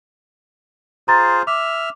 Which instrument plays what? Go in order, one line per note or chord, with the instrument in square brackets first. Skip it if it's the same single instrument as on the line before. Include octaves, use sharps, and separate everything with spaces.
[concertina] F4 G#4 C5 [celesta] A#5 C6 A6
[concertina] E5 F6 [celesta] D6